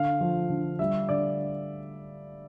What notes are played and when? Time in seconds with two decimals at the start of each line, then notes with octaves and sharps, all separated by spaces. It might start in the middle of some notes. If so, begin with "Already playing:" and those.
Already playing: D3 F5
0.21 F3
0.50 D3
0.79 G3 E5
1.09 D3 D5